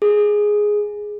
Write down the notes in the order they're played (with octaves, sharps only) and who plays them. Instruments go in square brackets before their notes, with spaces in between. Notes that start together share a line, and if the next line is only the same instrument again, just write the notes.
[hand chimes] G#4